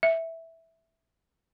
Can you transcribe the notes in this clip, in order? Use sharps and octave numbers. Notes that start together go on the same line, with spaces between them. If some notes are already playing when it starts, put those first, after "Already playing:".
E5